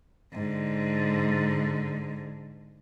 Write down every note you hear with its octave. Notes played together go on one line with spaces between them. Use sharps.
G#2 D3